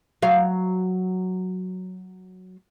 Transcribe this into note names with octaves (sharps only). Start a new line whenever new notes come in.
F#3 F5